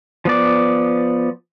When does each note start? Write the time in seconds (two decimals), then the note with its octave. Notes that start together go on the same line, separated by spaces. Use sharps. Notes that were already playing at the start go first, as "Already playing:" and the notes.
0.25 F3 B3 D5